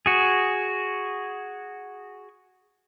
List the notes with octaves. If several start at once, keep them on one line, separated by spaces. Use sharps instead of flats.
F#4 G#4